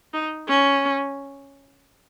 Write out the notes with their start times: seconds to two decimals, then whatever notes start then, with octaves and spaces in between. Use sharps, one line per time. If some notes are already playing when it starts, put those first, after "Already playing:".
0.13 D#4
0.48 C#4